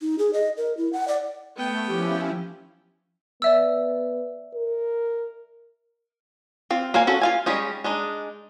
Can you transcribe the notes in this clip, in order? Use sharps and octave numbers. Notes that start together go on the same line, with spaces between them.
D#4
G#4
D#5
A#4
E4
F#5
D5
A3 B3 G5
F3 C#4 E4 G4
B3 D5 E5 E6
A#4
C4 F4
A#3 C5 F5 G#5
C#4 F#4 A4 A#4
F4 F5 G#5
G3 G#3 C#4 D#4
G#3 D4 D#4